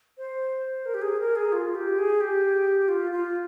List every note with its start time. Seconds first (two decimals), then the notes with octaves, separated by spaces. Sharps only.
0.18 C5
0.86 A#4
0.94 G4
1.02 G#4
1.20 A#4
1.36 G#4
1.53 F4
1.75 G4
1.99 G#4
2.21 G4
2.88 F4
3.11 F4